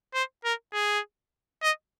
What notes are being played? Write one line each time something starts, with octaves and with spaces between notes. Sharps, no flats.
C5
A#4
G#4
D#5